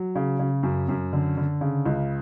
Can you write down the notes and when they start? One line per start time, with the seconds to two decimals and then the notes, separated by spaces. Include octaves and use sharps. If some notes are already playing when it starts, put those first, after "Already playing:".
Already playing: F#3
0.16 C#3
0.39 C#3
0.63 F#2
0.89 F#2
1.13 D3
1.37 D3
1.61 C#3
1.86 C#2